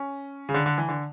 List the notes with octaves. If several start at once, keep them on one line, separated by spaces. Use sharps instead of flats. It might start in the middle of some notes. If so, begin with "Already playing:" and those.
Already playing: C#4
C#3
D3
D3
E3
D3